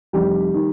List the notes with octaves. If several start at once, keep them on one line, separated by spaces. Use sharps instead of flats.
F1 G3 G4
D#3